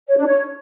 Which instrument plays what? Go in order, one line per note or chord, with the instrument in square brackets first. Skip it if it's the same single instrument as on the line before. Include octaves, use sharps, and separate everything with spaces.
[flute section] C#5
D4
C#5